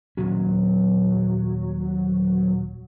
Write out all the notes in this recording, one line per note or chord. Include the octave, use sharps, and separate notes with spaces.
D#1 A#2 F#3 C#4